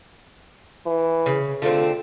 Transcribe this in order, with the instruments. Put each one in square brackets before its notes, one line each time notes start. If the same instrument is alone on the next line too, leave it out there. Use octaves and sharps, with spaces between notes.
[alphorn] E3
[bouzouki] C#3
[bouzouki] D3 A3 C4 [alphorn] F4